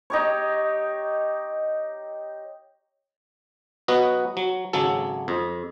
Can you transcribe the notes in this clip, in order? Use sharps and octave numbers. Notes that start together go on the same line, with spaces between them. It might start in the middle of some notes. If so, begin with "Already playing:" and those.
D#4 G4 C#5
F#3 B3 F#4 B4 D#5
F#3
G#1 C#3 F#3 A4
F2